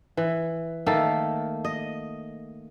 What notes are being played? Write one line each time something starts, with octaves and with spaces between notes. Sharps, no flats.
E3
D#3 A3 A#3 A4
D#5